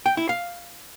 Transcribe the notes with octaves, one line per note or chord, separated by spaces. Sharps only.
G5
E4
F5